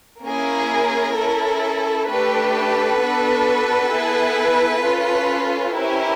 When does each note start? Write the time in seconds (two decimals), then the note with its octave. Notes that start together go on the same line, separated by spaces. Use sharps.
0.23 A#3 C#4 E4 G#4 A#4
1.15 C#4 E4 A4
2.07 A3 D4 G4 A4 B4
2.98 B3 D4 F#4
3.91 B3 E4 G#4
4.82 C#4 F4 A4
5.74 C#4 E4 G4 A#4 C5